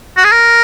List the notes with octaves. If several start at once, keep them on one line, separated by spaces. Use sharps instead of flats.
F#4
G#4
A#4